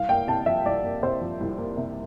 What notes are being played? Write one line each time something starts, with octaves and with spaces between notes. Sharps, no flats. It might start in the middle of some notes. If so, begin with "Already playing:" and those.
Already playing: C2 F5
A#3 G5
C3 A5
F3 E5
C2 D5
A#3
C3 C5
F3
C2
A#3
C3